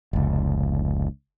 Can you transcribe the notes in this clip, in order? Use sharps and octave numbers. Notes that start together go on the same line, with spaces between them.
F1 C#2